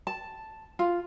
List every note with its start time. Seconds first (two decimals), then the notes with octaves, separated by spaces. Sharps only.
0.07 A5
0.79 F4